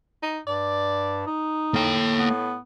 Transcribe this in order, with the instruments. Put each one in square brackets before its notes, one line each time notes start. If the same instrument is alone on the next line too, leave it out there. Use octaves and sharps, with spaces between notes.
[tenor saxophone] D#4
[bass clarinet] G2 [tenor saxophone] D5
[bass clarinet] D#4
[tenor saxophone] A2 [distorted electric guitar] A#3 G5
[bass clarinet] B3